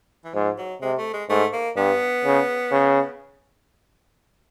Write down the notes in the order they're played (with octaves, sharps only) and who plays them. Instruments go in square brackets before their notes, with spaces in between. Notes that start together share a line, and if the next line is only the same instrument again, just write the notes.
[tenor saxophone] E3
[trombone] G#2 [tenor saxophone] F3
[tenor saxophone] F#3
[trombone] C3 [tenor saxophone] G#3
[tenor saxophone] A3
G#3
[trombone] G#2 [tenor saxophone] A3
[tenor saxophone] A#3
[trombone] G2 [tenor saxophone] B3
[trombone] C#3
C#3